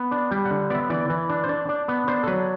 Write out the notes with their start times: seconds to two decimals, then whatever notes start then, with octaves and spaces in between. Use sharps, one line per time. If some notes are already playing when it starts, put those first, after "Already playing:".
Already playing: B3
0.11 D4
0.31 G3 G5
0.45 F#5
0.51 D3
0.70 B3 D5
0.75 E5
0.90 E3 D5
1.10 E3
1.29 D4
1.44 C5
1.49 D4 D5
1.69 D4
1.88 B3
2.08 D4 C5
2.23 A4
2.27 F#3 B4